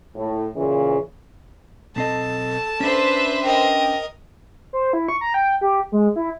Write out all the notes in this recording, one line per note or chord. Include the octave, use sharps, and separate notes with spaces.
A2
A#2 C#3 E3
B1 C4 A4 D#5 A5
C#4 D4 B4 C5 E5
A#4 D#5 G5
C5
E4
C#6
A#5
G5
G4
G#3
E4